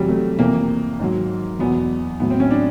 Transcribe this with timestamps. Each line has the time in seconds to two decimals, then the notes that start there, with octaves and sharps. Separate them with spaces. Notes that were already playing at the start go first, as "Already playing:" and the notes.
Already playing: F2 C3 E3 F#3 G3
0.09 A3
0.39 F2 C3 E3 A#3
1.00 G#2 D#3 F#3
1.59 E2 B2 F#3 B3
2.20 A2 F#3 B3
2.30 C4
2.40 C#4
2.51 D4